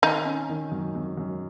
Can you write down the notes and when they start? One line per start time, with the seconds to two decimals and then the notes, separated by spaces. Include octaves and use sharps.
0.03 D#3 D#4
0.26 C#4
0.49 D#3
0.72 F#2
0.95 F#2
1.17 F#2